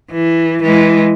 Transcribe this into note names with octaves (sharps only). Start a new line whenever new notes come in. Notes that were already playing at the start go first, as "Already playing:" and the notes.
E3
E3 G#3